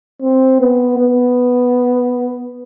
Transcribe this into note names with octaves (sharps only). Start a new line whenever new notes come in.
C4
B3
B3